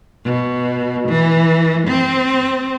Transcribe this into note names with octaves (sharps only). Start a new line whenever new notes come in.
B2
E3
C4